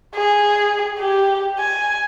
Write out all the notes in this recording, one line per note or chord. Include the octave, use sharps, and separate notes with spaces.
G#4
G4
G#5